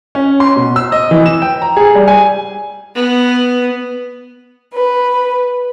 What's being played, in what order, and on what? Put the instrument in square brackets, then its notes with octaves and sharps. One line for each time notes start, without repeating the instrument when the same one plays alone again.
[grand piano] C#4
C6
B2
E6
D#5
E3
E7
G5
A#5
G#4
G3
G#5
[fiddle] B3
[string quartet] B4